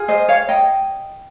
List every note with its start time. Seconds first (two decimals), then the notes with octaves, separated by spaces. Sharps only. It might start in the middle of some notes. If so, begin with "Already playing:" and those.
Already playing: F4 G#4
0.08 C5 D#5
0.29 C#5 F5
0.49 D#5 G5